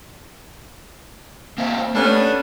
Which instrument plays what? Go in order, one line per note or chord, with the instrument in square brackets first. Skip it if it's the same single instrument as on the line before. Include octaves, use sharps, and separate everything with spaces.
[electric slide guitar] A#3 C4 E5
[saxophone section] G3 B3 C#4 [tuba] A3 [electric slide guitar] D4